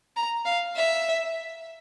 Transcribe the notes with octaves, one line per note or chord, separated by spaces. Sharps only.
A#5
F5
E5